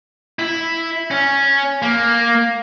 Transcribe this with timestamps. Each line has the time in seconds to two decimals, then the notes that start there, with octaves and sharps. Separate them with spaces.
0.39 E4
1.11 C#4
1.82 A#3